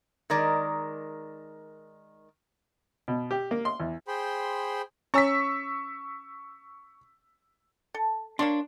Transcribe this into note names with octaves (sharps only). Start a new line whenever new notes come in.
D#3 G#3 A#4 D5
B2
G4
A#3
C6
E2
G#4 C5 G5 B5 C6
C#4 C#5 G#5 C#6 E6 B6
A4
A#3 D4 C#5 C6